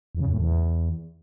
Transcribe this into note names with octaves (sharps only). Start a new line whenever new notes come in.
E2
C#3
F2
A2
E2